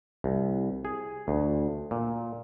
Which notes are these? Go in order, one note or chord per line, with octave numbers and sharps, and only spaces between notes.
C2
G#4
D2
A#2